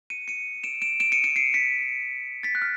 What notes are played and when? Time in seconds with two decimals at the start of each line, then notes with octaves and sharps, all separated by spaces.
0.10 C#7 D#7
0.28 C#7 D#7
0.64 D7 E7
0.82 D7 E7
1.00 D7 E7
1.12 C#7 D#7
1.24 C#7 D#7
1.36 C7 D7
1.54 B6 C#7
2.43 A6 B6
2.55 F#6
2.62 F6